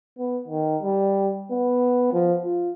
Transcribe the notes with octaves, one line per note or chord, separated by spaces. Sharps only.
B3
D#3
G3
B3
F3
F4